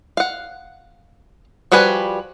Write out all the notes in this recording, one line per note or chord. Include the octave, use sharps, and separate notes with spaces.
F5 F#5
F3 G3 F#4 B4 G#5